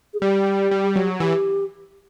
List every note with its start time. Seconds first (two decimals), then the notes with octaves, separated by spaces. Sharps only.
0.14 G#4
0.21 G3 G4
0.71 G3
0.96 F#3
1.20 E3 G4